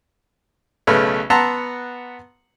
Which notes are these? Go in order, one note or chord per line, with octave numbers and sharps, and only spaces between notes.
B1 C#3 A3 B4 F6
B3 F#5 A5 A#5 C6 E6